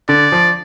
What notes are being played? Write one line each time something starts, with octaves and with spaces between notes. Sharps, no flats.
D3 D5
F3